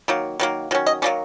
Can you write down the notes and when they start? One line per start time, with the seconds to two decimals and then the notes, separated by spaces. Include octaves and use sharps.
0.08 D#3 F#3 A#3
0.40 D#3 F#3 A#3
0.71 D#3 F#3 C#4
0.86 D#5
1.02 D#3 F#3 A#3 C#4 D5